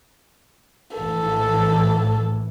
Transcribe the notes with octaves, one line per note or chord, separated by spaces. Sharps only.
A#1 A2 E3 A4